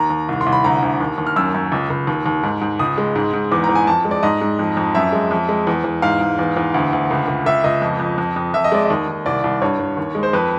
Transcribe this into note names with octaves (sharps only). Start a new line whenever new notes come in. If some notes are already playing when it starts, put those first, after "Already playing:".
Already playing: D#2 A#5
D#2
C2
C6
C2
B5
D2 A#5
D2
D#2
D#2
F6
F#2 E6
F#2
C#2
C#2
D#2
D#2
G#2
G#2
C#2 D#6
G#3
G#2
G#2
E2 D6
A#5
E2
G#5
F2 A5
G#3
D5
G#2 D#5
G#2
F2
F2
F#2 E5
G#3
F2
G#3
E2
E2
G#2 F5
G#2
E2
E2
D2
D2
C#2
C#2
C#2 E5
C#2 D#5
F2
F2
F2
F2
F2 E5
D#5
G#3 D5
D#5
D#2
D#2
C2 D5
C2
G2 C#5
G2
D#2
G#3
C5
F2 B4